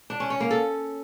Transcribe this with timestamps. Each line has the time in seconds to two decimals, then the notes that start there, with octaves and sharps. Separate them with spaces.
0.10 D4
0.20 C#4
0.30 C#4
0.40 A#3
0.51 A4